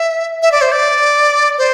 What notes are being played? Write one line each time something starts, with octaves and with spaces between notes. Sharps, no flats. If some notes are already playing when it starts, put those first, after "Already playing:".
Already playing: E5
E5
D5
C5
D5
C5